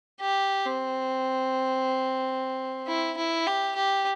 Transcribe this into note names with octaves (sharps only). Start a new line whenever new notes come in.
G4
C4
E4
E4
G4
G4